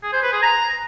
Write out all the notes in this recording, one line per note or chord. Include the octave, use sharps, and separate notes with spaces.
G#4
C5
B4
G#4
A#5